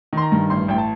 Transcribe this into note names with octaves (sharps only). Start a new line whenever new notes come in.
D#3 C6
A#5
G2
A1 C6
A1 G5
A5